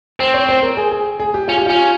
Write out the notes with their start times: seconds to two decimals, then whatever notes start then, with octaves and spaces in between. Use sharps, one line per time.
0.19 C4 C5
0.34 C#5
0.49 C5
0.62 A#4
0.77 G#4
0.91 G#4
1.20 G#4
1.34 G4
1.48 C#4 F4
1.58 G4
1.66 C#4 F4